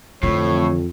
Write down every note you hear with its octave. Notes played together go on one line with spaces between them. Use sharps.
F2 A2 D3 E3 C#5